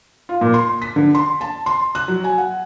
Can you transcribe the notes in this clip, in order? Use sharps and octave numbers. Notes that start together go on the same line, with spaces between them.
F4
A#2
C6
B6
D3
C6
A5
C6
F#6
F#3
G#5
F#5